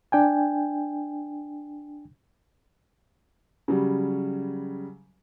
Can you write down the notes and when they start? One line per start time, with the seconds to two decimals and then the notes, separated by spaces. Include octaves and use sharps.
0.12 D4 G5 G#5
3.68 C#3 F#3 G3